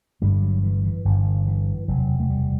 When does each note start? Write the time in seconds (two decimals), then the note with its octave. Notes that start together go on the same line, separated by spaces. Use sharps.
0.21 G1 G2 D3 G3
0.42 F#3
0.63 E3
0.84 E3
1.05 G1 G2 D3 E3
1.47 E3
1.88 E1 D2 C3 F#3
2.20 A3
2.30 G3